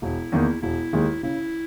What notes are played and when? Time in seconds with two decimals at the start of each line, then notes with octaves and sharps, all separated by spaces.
0.02 E1 E4
0.32 E2 D#3 A#3
0.62 E1 E4
0.93 D#2 D#3 G#3
1.23 C#3 E4